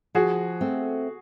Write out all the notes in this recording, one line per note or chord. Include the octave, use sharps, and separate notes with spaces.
F3 F#4 G#4
A3 C4